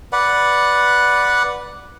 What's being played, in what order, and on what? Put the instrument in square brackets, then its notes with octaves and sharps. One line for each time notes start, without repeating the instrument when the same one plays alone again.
[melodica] B4 D5 F#5